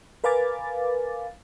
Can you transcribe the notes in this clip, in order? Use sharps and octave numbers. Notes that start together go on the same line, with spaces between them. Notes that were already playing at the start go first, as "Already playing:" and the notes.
A#4 B4 F5 G#5 D6 A6